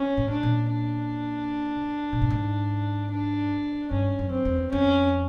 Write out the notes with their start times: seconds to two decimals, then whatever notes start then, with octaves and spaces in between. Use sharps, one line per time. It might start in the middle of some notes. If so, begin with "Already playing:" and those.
Already playing: C#4
0.17 A2
0.30 D4
0.43 A#2
0.70 D4
2.12 A#2
2.21 A2
2.30 G#2
3.11 D4
3.91 G2 C#4
4.19 F#2
4.32 C4
4.45 E2
4.72 F2 C#4